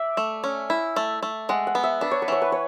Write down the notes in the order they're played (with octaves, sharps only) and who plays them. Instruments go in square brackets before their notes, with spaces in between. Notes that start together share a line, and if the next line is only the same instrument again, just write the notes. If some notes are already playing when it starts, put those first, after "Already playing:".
Already playing: [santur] D5 E5
[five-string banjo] A3
C#4
E4
A3
A3
[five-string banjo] G#3 [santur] F#5
[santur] F#5
[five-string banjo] B3
[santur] E5
[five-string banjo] D4 [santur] B4
[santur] C#5
B4
[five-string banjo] E3 [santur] C#5
[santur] B4
C#5